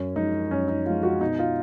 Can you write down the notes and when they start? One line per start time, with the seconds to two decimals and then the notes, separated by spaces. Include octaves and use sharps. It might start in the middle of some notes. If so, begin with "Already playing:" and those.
Already playing: F#2 C#4
0.16 F3 G#3 D#4
0.51 F#2 C#4
0.68 D#4
0.85 F3 G#3 F4
1.03 F#4
1.21 B2 D#4
1.39 F4